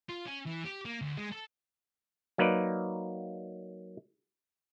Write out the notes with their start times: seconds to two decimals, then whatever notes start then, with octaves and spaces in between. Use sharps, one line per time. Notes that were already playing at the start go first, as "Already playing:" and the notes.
0.09 F4
0.26 C#4
0.46 E3
0.64 G4
0.85 A#3
1.02 D2
1.18 G#3
1.32 A4
2.38 F#3 A#3 D#4 B4 D5